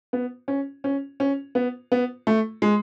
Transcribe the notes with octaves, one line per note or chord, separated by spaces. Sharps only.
B3
C#4
C#4
C#4
B3
B3
A3
G#3